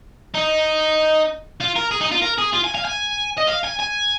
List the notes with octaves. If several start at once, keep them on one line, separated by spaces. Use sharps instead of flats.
D#4
F4
A#4
G#4
D#4
F4
A#4
G#4
F4
G#5
F5
G#5
D#5
F5
G#5
G#5